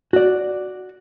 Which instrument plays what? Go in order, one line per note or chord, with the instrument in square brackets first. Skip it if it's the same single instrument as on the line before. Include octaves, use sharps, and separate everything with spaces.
[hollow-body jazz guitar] F#4 D5